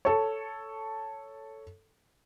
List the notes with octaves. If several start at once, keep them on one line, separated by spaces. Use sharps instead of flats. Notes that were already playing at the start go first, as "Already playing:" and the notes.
A4 C#5